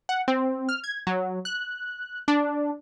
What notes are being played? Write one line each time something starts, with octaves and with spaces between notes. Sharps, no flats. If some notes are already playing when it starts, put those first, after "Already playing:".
F#5
C4
F6
G#6
F#3
F#6
D4